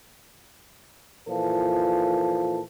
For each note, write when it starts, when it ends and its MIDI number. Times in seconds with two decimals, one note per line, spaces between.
1.27 2.60 46
1.27 2.60 52
1.27 2.60 53
1.27 2.60 69